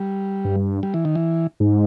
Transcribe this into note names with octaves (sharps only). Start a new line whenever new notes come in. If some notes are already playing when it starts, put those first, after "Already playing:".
Already playing: G3
G2
G3
E3
D#3
E3
G#2